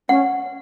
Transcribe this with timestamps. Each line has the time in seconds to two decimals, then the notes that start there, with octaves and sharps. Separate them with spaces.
0.09 C#4 F#5